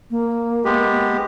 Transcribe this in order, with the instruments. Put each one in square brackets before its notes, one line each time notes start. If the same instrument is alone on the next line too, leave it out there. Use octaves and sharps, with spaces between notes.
[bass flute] A#3
[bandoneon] G#3 B3 G4